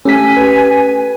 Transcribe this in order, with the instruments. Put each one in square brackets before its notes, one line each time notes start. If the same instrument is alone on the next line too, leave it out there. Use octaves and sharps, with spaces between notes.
[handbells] A3 G4 A4 [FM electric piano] C#4 B6 [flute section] G#5
[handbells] G4 B4